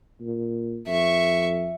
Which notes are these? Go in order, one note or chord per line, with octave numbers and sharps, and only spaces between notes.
A#2
F2 E5 C#6